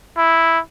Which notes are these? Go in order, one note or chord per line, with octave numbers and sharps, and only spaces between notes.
E4